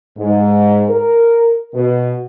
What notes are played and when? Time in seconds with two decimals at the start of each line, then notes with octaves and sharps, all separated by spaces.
0.17 G#2
0.89 A#4
1.74 B2